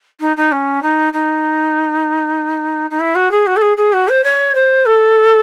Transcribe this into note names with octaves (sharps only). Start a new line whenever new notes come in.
D#4
D#4
C#4
D#4
D#4
D#4
E4
F#4
G#4
F#4
A4
G#4
G#4
F#4
C5
C#5
C5
A4